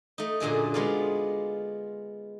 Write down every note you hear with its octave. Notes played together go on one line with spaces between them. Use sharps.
A3 D#4
F#2 A#2 D3 G#4
G#3 B3 F4 D5 F5